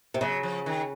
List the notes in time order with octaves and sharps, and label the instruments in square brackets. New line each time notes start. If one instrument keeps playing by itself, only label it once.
[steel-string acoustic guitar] C3
[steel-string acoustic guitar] C#3 [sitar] F#3
[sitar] F3
D#3